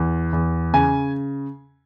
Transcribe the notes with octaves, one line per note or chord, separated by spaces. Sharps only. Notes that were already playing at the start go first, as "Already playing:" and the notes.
Already playing: E2
E2
C#3 G#5